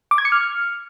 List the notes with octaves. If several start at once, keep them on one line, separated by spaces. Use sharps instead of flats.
D6
G#6
C#7
F6